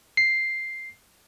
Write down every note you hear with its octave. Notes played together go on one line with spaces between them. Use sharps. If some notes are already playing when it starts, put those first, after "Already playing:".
C7